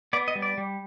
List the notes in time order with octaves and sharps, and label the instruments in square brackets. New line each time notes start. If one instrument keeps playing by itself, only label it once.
[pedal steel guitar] B3 D5
D#5
G3
D5
G3